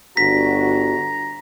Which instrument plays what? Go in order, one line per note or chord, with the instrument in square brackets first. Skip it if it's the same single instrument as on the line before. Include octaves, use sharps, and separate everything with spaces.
[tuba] G1 [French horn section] D4 F#4 [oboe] A#5 [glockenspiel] B6